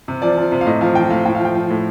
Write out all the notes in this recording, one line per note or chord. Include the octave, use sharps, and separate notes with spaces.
C3
F3 D5
F3
C3
F5
A2 D#5
F3 F5
F3 G5
A2 F5
A2 G5
F5
F3
G5
F3
A2